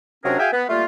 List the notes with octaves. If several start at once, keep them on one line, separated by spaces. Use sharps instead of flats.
C3 F#3 C#4 D4 G#4 A#4
F#4 G#4 E5 F5 G5 G#5
B3
G3 A3 A#3 F4